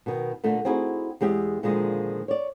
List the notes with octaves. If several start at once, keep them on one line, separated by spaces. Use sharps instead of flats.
B2 D#3
A#2 D3 A3
C4 D#4 E4 F#4 G#4
E2 G#3 G4 E5
A#2 D3 D#3 F3 G#3
C#5 D5